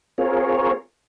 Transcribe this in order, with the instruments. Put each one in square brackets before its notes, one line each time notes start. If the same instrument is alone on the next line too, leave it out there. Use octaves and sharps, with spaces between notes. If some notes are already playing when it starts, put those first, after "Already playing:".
[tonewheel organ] C4 F4 G#4 A#4 C#5